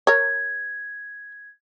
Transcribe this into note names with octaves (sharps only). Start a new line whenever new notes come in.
A#4 C#5 G#6